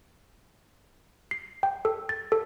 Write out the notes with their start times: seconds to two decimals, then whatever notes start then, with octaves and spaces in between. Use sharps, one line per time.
1.31 C7
1.63 G5
1.85 A4
2.09 A6
2.32 A4